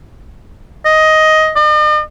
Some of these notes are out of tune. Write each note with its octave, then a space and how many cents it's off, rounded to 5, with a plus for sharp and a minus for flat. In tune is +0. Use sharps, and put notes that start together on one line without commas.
D#5 +10
D#5 -45